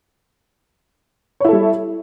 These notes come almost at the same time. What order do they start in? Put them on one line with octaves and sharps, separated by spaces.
C#5 E4 A4 G3